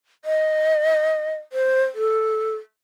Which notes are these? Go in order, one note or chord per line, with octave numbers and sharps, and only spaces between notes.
D#5
C5
A4